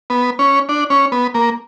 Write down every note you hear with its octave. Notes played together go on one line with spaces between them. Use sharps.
B3
C#4
D4
C#4
B3
A#3